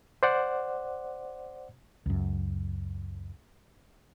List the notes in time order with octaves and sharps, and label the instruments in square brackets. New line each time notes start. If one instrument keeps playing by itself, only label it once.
[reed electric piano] C5 D5 F#5
[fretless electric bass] C#2 F#2